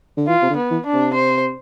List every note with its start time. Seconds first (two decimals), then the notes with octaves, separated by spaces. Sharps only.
0.17 D3
0.28 E3 F4
0.42 C3
0.50 D3
0.56 B3
0.71 E3
0.86 D4
0.93 C3
1.14 C5